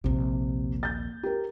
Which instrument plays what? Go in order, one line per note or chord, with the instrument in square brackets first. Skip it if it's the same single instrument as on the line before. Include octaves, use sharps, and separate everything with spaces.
[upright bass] A#1 D#2 [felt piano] C3
[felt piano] G6 A6
G4 A#4